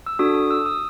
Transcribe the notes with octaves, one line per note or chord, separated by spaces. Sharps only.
E6
D4 F#4 A4 D#6
D#6
E6
D#6